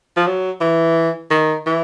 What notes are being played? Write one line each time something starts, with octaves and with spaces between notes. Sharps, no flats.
F3
F#3
E3
D#3
E3